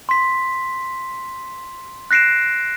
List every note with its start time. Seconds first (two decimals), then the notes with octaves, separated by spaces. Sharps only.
0.09 C6 B6
2.11 F#6 A#6 C7 D7 E7